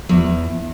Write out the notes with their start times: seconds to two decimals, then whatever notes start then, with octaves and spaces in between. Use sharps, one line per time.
0.09 E2 F3